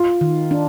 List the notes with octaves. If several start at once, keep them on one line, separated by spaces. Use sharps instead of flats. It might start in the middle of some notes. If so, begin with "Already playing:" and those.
Already playing: F4
D#3
D4